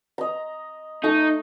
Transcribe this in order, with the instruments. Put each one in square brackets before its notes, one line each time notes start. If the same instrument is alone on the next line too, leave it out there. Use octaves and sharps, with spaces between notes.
[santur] D#5 A#5
[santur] A3 [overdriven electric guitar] D#4